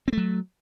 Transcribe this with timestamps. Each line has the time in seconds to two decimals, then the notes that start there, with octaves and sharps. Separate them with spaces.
0.08 C4
0.13 A3
0.17 F#3